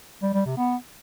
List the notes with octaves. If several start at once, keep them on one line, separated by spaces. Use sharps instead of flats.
G3
G3
C3
B3